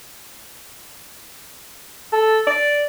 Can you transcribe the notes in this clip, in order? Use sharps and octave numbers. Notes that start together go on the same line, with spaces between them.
A4
D5